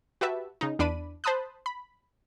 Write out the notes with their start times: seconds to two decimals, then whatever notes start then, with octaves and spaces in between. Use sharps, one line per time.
0.21 F#4 G4 B4 E5 A5
0.61 C#3 D#4
0.79 E2 D4 D5 B5 D#7
1.24 C5 A5 B5 D#6 F#6
1.66 B5